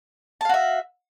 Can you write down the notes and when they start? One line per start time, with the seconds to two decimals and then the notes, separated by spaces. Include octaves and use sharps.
0.41 A5
0.45 F5
0.49 F#4
0.54 E5